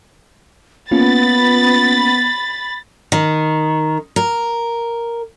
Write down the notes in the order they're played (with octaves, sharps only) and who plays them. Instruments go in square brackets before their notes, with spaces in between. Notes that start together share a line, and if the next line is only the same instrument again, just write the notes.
[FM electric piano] A#3 C#4 F4 [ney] B3 [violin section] B5 A6
[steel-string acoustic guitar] D#3
A#4